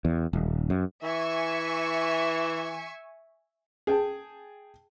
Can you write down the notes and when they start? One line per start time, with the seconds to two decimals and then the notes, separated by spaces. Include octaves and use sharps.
0.05 E2
0.33 D#1
0.70 F#2
1.03 E3 E5 G#5 C#6
3.87 G#4 G5 A5